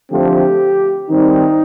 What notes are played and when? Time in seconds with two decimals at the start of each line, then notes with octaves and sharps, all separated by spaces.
0.11 D3 F3 A3 C4 G4
1.10 D#3 G3 C4 D#4